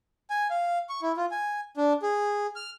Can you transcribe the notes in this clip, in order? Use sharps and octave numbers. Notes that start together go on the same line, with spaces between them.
G#5
F5
C#6
E4
F4
G#5
D4
G#4
F6